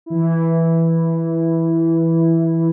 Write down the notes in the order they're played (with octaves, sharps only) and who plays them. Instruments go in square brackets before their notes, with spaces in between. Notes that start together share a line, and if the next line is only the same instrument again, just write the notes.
[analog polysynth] E3 E4